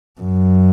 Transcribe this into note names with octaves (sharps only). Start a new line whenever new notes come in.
F#2